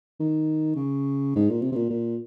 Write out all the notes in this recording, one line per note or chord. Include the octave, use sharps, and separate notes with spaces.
D#3
C#3
G#2
A#2
C3
C3
A#2
A#2